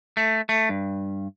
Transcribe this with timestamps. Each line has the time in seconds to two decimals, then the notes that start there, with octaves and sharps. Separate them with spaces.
0.17 A3
0.49 A3
0.69 G2